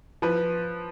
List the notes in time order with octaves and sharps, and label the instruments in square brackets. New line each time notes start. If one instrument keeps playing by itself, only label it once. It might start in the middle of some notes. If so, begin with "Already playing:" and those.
[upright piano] F3 B4